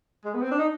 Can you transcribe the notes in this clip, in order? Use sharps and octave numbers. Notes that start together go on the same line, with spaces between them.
G#3
B3
C4
D4
D#4